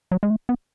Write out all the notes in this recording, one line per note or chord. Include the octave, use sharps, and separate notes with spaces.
F#3
G#3
A3
B3